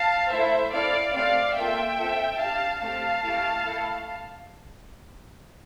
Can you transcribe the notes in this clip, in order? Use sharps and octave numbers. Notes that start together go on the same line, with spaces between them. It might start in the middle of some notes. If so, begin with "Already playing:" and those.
Already playing: F5 A5
A3 E4 A4 C5 E5
C4 E4 A4 D5 F5
A3 C4 G4 D5 F5
A#3 F4 A4 E5 G5
C4 F4 A4
D4 G4 F5 A5
A3 C4 G4 F5 A5
A3 E4 G4
A3 E4 A4